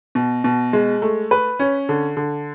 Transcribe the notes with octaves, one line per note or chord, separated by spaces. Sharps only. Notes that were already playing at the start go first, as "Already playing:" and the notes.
B2
B2
G#3
A3
B4
C#4
D3
D3